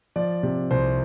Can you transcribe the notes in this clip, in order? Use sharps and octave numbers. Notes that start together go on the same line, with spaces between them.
F3 D5
C3
C2 C5